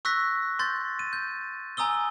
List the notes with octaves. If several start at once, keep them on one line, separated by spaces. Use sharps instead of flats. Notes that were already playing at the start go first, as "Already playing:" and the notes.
C#6 E6 F#6 A#6 B6
C6 G6 A6
D#7
G6
G#5 A#5 D#6 E6 G7